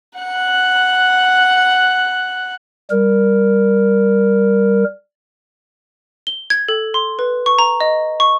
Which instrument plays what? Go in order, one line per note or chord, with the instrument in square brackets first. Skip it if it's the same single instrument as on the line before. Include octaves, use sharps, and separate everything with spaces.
[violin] F#5 F#6
[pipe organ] G3 A#4
[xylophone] G7
G#6
A4
C6
B4
C#6
A#5
D#5
C#6